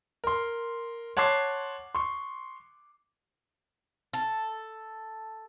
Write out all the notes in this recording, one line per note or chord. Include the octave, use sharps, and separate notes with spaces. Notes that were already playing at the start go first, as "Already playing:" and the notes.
A#4 C6
C#5 F#5 A5 C6 D6 C7
C6 C#6
A4